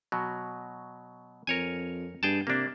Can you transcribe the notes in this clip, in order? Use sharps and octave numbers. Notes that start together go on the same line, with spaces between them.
B2 F#3
F2 A#4 C#5 G#5
G2 G#4 G5 A5
C3 A#3 D4